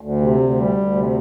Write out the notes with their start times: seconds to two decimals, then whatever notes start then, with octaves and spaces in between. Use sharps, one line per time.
0.01 D2
0.21 C3
0.40 D2
0.58 G3
0.77 D2
0.95 C3